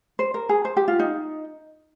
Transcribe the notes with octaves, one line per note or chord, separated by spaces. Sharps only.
C5
A#4
G#4
C5
G4
F4
D#4